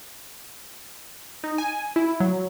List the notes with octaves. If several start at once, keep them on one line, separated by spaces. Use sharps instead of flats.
D#4
G#5
E4
F#3